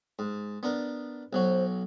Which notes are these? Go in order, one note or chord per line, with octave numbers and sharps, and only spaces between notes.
G#2
B3 D4 A#4
B1 F#3 F#4 C5